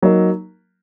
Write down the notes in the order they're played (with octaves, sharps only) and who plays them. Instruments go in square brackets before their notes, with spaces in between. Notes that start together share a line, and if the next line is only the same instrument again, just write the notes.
[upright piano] F#3 A#3 D#4